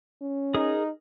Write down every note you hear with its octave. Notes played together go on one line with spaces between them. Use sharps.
C#4
D#4 G#4 A#4 D#6